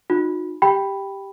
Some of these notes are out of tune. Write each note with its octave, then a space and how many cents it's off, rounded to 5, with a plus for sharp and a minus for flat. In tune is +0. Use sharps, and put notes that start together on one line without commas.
D#4 -20 F#4 -45
G4 +0 G5 +0 B5 +0